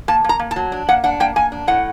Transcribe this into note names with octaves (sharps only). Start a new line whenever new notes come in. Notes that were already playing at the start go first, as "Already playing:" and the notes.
A#3 A5
A#3 A#5
A#3
A5
F#3
D4
A#3 F#5
D4 F#5
A#3 G5
A#3 G#5
D4
A2 F#5